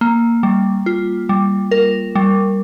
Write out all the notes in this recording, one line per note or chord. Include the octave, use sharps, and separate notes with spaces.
A#3
G3
F4
G3
A#4
G3